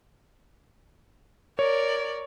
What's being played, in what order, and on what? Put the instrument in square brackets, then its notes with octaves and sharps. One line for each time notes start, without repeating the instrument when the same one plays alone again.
[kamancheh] A#4 D5 [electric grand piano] C#5